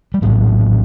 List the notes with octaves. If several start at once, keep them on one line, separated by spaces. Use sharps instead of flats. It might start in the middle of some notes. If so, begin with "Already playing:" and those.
G3
A#1 A2 F#3